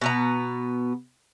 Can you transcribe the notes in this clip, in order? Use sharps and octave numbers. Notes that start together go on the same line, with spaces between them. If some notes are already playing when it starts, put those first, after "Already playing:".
B2 B3 A#5